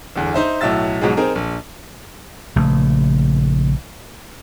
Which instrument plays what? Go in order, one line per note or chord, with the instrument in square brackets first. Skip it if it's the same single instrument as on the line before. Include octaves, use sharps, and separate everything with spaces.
[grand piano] G1 E2
D#4 C5 E5
B1 A2 F#3 E5 E6 A6
G#2 B2 F3 F#3 G#3
C4 D#4 G#4 A#4
A#1
[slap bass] A#1 C#3 A3